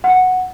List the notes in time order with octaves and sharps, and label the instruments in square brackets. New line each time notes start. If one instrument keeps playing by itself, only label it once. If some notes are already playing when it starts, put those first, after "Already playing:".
[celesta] F#5